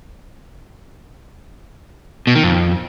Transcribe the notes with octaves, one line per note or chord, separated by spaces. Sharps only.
B2
D#3
F2